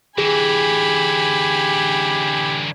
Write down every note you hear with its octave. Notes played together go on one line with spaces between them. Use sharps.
D3 E3 G4 G#4 G#5 B5